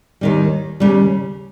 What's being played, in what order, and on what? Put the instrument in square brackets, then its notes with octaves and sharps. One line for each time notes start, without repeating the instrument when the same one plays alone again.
[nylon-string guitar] D#2 D#3 G3
D#2 C#3 G3